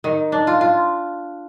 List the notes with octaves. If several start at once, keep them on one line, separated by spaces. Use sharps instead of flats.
D#3
D4
F4
F4